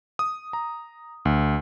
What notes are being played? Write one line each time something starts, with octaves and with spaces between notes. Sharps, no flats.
D#6
A#5
D2